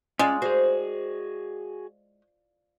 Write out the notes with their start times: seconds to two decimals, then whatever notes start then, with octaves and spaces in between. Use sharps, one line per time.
0.19 G#3 C#4 F4 D5
0.42 F#4 G#4 C5